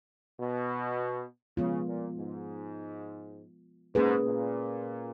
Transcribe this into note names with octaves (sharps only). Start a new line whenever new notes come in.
B2
C#3 F3 G#3 B3 F4
A#2
G#2
G#2 A#3 C#4 G#4 B4
A#2